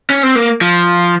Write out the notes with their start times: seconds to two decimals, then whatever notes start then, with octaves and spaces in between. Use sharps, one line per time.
0.10 C#4
0.23 C4
0.35 A#3
0.61 F3